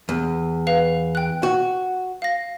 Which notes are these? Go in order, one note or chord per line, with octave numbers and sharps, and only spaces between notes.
E2
B4 F5 F7
G5 F#6
F#4
F5 A#6